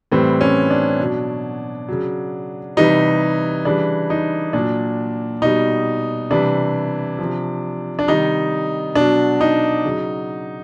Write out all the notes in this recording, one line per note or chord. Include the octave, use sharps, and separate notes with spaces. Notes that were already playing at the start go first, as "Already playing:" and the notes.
A2 E3 G3 C4
C#4
D4
B2 F#3
C#3 F#3
C3 E3 G3 D#4
C#3 E3 G3 D4
D#4
A#2 F#3 D4
B2 G3 D#4
C3 E3 G3 D4
F3
C3
D4
C3 D#3 G3 D#4
B2 F#3 D4
D#4
C#3 F#3